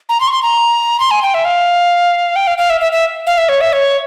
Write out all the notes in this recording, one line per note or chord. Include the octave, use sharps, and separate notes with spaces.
A#5
C6
C#6
C6
A#5
C6
G#5
G5
E5
F5
G5
F5
F5
E5
E5
E5
F5
E5
C#5
E5
C#5